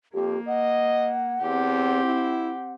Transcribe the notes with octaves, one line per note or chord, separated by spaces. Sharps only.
F2 A#3 G4
D#5 F#5
E2 C4 G4
E4